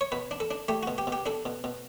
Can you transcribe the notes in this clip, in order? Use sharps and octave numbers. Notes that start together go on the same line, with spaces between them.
C#5
B2 B4
D4
A4
D4
A3 G4
B2 F#4
G4
B2
G4
D4 A4
B2
B2